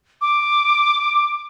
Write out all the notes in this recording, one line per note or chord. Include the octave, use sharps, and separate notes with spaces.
D6